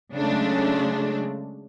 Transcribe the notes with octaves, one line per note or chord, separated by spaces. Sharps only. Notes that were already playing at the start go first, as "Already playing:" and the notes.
C#3 F#3 G#3 A3 D4